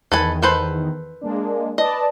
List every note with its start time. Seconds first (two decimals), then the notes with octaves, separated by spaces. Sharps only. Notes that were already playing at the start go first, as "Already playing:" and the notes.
0.12 E2 D#3 A4 B4 G#5
0.42 A4 B4 C5
1.21 G#3 A#3 D4
1.78 B4 D5 D#5 A5